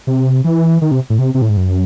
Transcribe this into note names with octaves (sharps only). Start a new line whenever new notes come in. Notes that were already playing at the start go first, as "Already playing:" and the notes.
C3
E3
D#3
C3
A2
C3
C3
A2
G#2
F#2